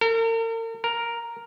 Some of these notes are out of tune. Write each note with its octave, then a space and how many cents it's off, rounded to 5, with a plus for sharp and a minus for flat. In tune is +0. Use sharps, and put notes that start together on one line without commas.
A#4 -45
A#4 +0